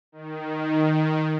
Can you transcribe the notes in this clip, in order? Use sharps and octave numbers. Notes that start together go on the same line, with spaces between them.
D#3